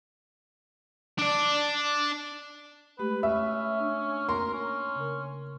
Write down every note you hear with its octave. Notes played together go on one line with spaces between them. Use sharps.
D4 D5
G#3 A3 G4 B4
C#4 E5
D4
A#3 A#4 C6
C#4
C#3 A#4